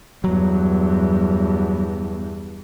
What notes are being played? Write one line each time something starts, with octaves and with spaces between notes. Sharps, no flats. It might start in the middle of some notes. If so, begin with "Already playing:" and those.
E2 G2 F#3